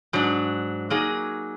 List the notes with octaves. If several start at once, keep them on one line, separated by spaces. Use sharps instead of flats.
G#2 F#3 D4
F#3 A#3 D#4 G#4